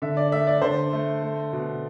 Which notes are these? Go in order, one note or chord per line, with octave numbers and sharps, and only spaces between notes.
D3 E5
D5
A3 E5
D5
D3 C5
A3
A3
B2